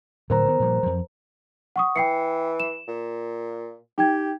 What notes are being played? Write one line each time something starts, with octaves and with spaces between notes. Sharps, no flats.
A2 D3 F#3 A#4 C5 A#5
D#3 B3
A#2 F3 G3
F2 F3
F#5 C#6 D#6
E3 G5 C7 C#7
E7
A#2
D#4 G4 G5 G#6